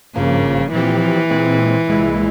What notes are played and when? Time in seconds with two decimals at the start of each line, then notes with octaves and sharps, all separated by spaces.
0.15 G#1 G2 C#3 F3 A#3
0.72 A#2 E3 F3 C4 G4
1.30 A#2 G#3 C4
1.88 C2 A#2 G#3 E4